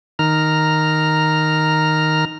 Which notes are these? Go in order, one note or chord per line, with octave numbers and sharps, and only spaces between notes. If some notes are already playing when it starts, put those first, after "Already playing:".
D#3 A#5 F6